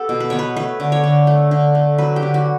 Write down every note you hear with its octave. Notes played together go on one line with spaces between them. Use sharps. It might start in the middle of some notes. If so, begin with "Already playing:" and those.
Already playing: B3 G4 A4
B2
B4
B3 C#5
B4
A3 B4
D3
C#5
D3
A3
D3
A3
F#3 B4
G4
D3
F#4